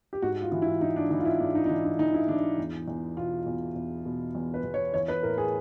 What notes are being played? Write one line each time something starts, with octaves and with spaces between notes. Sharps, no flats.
G4
G#2 F#4
F4
E3
E4
E3 D#4
D4
E3 D#4
F4
E4
G#2 D4
D#4
D#4
E3 D4
D#4
E3 D#4
E4
E3 D4
E2
E2
B2 F4
E2
E2
B2
E2
B4
E2
C#5
E3 C#5
B4
A2 A#4
G#4